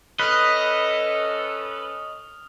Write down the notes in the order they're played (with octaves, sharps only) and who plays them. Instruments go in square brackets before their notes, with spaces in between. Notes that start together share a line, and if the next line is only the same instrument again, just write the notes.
[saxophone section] C#4 A4 [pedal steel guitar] B4 [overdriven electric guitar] D#5 [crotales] D#6 F6